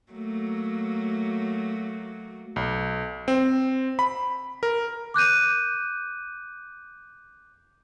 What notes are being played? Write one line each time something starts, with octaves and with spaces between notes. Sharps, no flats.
F#3 A3 A#3
B1
C4
B5
A#4
D6 F#6 G6 D#7